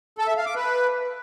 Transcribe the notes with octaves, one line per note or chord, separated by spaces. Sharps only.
A4
E5
F5
D6
B4